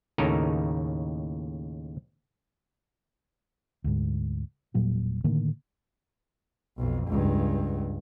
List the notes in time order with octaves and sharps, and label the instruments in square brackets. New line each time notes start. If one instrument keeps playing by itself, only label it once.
[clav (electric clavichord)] D#2 A2 C#3 D#4 A4 A#4
[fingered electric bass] D2 G#2
E1 A#2 F#3 G3
A2 D3 D#3 A#3
[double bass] B1 F2
C#2 G2